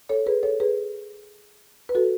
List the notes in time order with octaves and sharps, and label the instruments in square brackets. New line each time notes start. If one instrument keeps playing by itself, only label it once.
[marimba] A4 C#5
G#4 B4
A4 C#5
G#4 B4
B4
F#4 A4